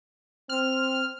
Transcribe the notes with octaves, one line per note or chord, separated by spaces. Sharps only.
C4 F6